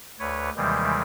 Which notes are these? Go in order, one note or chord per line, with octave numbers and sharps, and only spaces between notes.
D2 B4 C#5
D#2 C3 D#3 E3 G3 G#3